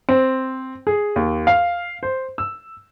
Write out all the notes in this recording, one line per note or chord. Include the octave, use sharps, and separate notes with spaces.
C4
G#4
D#2
F5
C5
E6